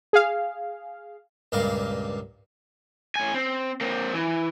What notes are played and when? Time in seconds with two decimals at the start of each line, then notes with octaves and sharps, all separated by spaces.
0.13 G#4 F5
1.52 C#2 G2 A#2 A#4 F5
3.16 A2 G#5
3.34 C4
3.81 A#3 C4
4.14 E3